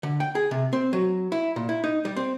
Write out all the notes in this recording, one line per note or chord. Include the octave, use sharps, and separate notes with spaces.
D3
G5
G#4
C3
C4
F#3
E4
A#2
E4
D#4
G3
C4